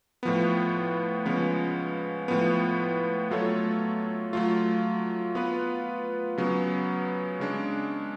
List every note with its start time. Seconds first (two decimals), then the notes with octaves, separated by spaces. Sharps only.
0.23 A2 F3 B3
1.25 C#3 F3 G#3 B3
2.28 A2 F3 B3
3.31 F#3 A3 F4 A4 C#5
4.33 F#3 A3 F4
5.35 B3 F4 B4
6.38 C#3 F#3 B3
7.40 C#3 G#3 D4